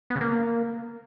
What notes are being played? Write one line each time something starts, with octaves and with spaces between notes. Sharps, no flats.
B3
C#3
A#3